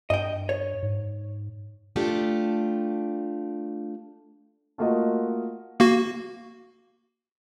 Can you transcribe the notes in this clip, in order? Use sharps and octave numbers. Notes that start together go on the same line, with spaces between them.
G2 D#5 G5
C#5
G#2
A3 D4 F4 G4
A3 A#3 F4 F#4 A#4 D#5
A#3 F#4